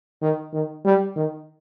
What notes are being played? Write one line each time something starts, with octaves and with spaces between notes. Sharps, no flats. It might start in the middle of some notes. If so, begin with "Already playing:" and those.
D#3
D#3
G3
D#3